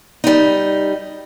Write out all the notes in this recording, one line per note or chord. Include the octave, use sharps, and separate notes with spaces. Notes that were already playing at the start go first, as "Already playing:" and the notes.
G3 D#4